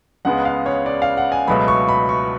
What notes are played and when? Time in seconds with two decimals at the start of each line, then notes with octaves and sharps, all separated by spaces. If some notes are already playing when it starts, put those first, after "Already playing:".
0.25 C#2 C#3 G#3 B3 F#5
0.45 F5
0.66 C#5
0.86 D5
1.02 F5
1.17 F#5
1.32 G#5
1.47 C#2 B2 F#3 A3 B5
1.68 C#6
1.88 B5
2.09 C#6